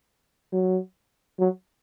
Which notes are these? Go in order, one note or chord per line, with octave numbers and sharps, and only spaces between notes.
F#3
F#3